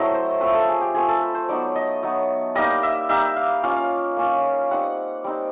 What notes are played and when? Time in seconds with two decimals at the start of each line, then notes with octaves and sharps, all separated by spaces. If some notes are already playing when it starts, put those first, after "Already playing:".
Already playing: F#3 A3 C4 E4 D#5
0.14 C5
0.41 F3 A3 C4 B4
0.54 A4
0.69 G#4
0.81 G4
0.94 F3 A3 C4 G#4
1.08 A4
1.22 B4
1.35 C5
1.48 F#3 B3 D#4 D5
1.76 D#5
2.03 F#3 B3 D#4
2.55 G3 A#3 D#4 D#5
2.83 E5
3.09 G3 A#3 D#4 E5
3.36 F5
3.63 A#3 C#4 F4 F5
4.17 A#3 C#4 F4
4.71 G3 C4 D#4 F#5
5.24 G3 C4 D#4